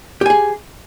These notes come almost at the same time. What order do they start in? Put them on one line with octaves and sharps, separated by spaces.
G4 G#5 G#4